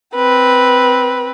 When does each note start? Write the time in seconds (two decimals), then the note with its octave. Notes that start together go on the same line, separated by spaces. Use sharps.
0.15 C4 B4